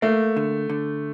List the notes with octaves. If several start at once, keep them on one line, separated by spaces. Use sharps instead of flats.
A3 A#3
D3
D3